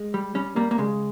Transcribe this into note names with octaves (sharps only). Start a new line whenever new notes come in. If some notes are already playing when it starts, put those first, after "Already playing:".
Already playing: G#3
G3
G3 C#4
G3 A#3
A#3
C#3 G#3